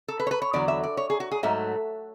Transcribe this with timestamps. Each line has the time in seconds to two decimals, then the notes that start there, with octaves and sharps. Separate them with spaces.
0.08 A4
0.20 B4
0.27 C#5
0.31 B4
0.42 C#5
0.53 E2 D3 F#3 D5
0.68 E5
0.83 D5
0.97 C#5
1.10 G#4
1.20 F#4
1.32 G#4
1.43 G#2 F#3 A3 E5